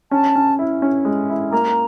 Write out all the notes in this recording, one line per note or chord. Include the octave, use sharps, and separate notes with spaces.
C#4 A5
C#4
E4
C#4
G#3
E4
A#3 A#5